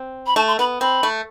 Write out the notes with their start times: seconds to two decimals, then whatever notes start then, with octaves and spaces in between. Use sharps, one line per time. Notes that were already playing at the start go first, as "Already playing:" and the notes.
Already playing: C4
0.27 B5
0.36 A3 A5
0.47 C6
0.59 B3 B5
0.81 C4 B5
1.03 A3